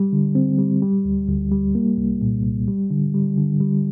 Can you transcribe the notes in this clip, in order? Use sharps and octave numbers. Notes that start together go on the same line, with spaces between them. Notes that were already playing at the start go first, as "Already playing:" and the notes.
Already playing: G3
D3
C4
G3
G3
D2
D2
G3
A#3
C2
A#2
C2
G3
D3
G3
D3
G3